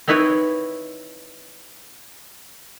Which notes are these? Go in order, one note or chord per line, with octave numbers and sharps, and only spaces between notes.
C4 D#4 E4 B4 C#5